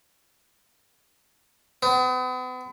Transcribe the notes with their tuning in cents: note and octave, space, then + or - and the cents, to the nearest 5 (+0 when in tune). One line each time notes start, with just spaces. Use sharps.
B3 +40